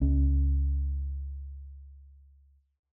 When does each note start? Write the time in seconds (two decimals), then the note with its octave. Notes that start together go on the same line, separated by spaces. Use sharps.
0.01 C#2 C#4